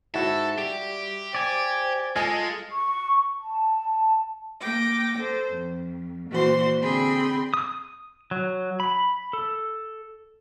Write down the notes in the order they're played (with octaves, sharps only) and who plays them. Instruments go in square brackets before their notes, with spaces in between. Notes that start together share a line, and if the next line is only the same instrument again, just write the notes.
[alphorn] G#2 [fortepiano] E4 F#4 [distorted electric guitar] A4
[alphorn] G3 [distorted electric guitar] G4
[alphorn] C5 [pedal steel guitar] D5 G#5
[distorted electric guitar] G#3 [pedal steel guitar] F4 A4 [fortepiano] D#5 G#5
[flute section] C#6
A5
[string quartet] A#3 G5 D6 A#6
A4 C5
F2
A#2 E3 F#4 C5 C6
D3 C4 G#4 G5 B5 C6
[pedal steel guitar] D#6
F#3
B5
A4